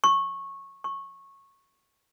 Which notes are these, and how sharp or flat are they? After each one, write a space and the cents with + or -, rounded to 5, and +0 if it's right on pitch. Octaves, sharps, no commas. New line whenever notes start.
C#6 -15
C#6 -15